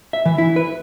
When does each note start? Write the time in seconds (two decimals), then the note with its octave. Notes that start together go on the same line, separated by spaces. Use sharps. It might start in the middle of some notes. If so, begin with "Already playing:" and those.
0.13 E5
0.26 E3
0.38 E4
0.56 B4